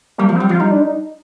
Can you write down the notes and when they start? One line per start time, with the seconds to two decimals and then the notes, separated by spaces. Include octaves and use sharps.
0.18 G3 A#3
0.29 F3
0.35 C4
0.40 G3
0.49 F3 F4
0.60 G3 D#4
0.71 D4
0.82 D#4